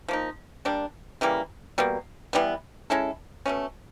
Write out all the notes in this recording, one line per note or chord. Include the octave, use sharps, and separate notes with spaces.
F3 A#3 D#4
G3 A#3 D4
C#3 E3 G3 A#3
B2 G3 A#3
E3 G3 B3
G#3 C#4 E4 A4
B2 F#3 A3 C#4